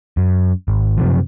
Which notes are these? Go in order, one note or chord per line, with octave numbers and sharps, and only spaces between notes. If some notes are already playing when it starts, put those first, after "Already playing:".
F#2
G#1
F#2 C3 F3